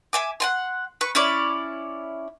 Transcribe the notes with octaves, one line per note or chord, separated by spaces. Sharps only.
E5 G#5 D6
F#5 G#5 C6
B4 C#6
C#4 E4 C#5 D5